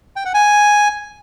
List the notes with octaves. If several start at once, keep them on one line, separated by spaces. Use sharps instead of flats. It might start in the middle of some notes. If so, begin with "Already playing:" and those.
G5
F#5
G#5